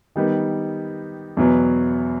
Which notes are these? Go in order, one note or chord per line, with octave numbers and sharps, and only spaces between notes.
D#3 G3 B3 D#4
E2 B2 F#3 B3